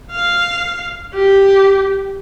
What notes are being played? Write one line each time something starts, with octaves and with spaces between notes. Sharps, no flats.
F5
G4